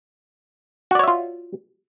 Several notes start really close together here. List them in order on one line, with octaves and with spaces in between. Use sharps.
F#4 D5 C#5 E5 F4